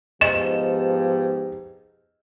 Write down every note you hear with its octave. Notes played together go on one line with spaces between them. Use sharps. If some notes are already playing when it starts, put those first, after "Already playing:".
G#2 F3 B3 G4 D#5 C#6 E7